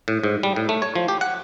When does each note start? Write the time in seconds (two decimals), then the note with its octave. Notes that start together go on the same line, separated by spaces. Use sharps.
0.08 A2
0.24 G#2
0.43 G3
0.56 A2
0.69 A3
0.82 C#5
0.96 F3
1.08 G4
1.21 F#5